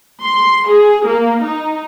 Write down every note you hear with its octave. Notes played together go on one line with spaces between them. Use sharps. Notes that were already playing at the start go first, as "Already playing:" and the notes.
C6
G#4
A#3
D#4